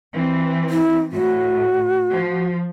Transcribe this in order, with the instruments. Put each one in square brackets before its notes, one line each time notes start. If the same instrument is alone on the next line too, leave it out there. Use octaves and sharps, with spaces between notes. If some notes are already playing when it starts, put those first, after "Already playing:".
[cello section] E3 C4
[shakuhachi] E4
[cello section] A2 [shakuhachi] F#4
[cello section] F3